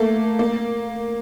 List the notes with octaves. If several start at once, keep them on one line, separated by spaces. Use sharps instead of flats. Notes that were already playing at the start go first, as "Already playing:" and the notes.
Already playing: A3 A#3
A#3